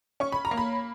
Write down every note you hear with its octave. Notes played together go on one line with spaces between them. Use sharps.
C#4 C#6
B5
A#5
A#3
B5